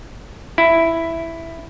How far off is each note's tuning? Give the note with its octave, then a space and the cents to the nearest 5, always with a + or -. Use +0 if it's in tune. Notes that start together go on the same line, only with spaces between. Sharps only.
E4 +5